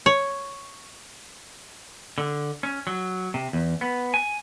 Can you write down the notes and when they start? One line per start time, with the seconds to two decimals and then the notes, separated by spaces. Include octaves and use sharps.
0.06 C#5
2.18 D3
2.63 C#4
2.87 F#3
3.34 C3
3.53 E2
3.81 B3
4.14 G#5